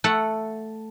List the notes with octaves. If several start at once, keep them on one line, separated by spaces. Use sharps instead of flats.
A3 A4 F#5